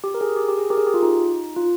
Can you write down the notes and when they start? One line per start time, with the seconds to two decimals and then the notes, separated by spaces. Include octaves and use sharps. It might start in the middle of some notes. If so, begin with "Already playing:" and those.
0.04 G4
0.14 A#4
0.21 G#4
0.37 G4
0.48 G4
0.58 G#4
0.70 G4 A#4
0.78 G#4
0.87 G4
0.94 F4
1.03 D#4
1.56 F4